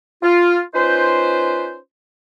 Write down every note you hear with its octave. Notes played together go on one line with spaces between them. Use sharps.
F4
C#4 D#4 F4 B4 C5